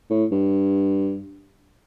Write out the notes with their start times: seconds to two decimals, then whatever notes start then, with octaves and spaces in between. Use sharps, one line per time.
0.10 A2
0.32 G2